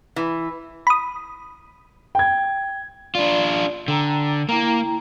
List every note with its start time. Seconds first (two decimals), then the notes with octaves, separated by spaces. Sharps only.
0.16 E3
0.87 B5 D#6
2.15 G5 G#6
3.15 D4 F4 D5
3.88 D3 G5 A#5 E6
4.49 A#3 E4 G5 A#5